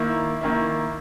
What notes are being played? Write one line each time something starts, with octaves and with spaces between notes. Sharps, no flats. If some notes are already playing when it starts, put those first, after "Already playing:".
Already playing: D#3 A#3 E4
D#3 A#3 E4